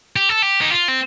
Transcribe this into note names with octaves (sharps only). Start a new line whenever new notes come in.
G4
A4
G4
D#4
F4
C4